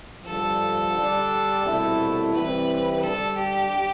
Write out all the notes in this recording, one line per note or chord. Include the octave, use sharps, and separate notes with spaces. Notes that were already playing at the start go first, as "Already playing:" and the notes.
G2 D3 F3 A4
D3 G3 D4
C2 B2 A3 E4
C3 E3 G3 C4 E4 B4
D3 G3 D4 A4
G4